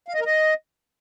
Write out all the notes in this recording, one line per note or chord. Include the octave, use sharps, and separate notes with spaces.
F5
D#5
A#4
D#5